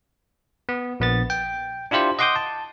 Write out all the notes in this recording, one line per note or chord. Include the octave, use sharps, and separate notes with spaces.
B3
A#1 B3 A6
G5
D4 E4 F4 G4 C5
D#5 F#5 C6 D6 D#6 G6
A5